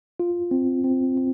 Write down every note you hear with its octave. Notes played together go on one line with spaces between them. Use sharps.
F4
C4
C4
C4